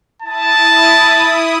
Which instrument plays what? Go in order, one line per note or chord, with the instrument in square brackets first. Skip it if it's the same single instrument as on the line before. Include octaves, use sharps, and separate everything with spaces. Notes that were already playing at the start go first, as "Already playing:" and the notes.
[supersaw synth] E4 D#6 [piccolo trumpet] A5